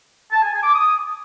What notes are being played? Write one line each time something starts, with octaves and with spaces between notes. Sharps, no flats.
A5
G#5
G#5
D6
D#6